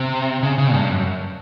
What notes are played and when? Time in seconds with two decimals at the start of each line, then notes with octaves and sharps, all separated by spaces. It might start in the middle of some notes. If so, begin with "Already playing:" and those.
Already playing: C3
0.43 C#3
0.58 C#3
0.74 G2
0.89 F#2